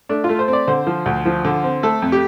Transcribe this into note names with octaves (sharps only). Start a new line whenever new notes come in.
A3 D4
F4
A3
C5
C4
D5
D3 C5
F3
D2
F3
D3
C4
A3 A4
F2
G4